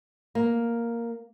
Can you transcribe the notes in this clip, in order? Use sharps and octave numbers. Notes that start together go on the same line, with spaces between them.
A#3